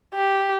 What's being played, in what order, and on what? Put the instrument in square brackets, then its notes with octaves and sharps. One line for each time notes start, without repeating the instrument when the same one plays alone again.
[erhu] G4